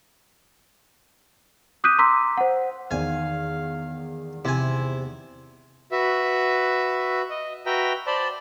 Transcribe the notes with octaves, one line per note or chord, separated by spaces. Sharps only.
D6 D#6 F#6 G6 B6 D#7
A#5 C6 D6 E6 B6
C5 F#5
E2 D#3 D5 F5 G#5
C3 E4 G#5
F#4 B4 E5
D#5
F#4 B4 E5 G5 A#5
C5 D5 A5 B5